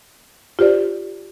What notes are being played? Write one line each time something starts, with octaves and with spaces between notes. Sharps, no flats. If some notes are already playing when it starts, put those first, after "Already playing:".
F4 G4 C5 D5